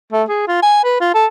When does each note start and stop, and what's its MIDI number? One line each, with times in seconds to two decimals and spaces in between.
0.12 0.23 57
0.29 0.45 68
0.48 0.62 65
0.62 0.81 80
0.84 0.96 71
1.00 1.14 65
1.14 1.26 69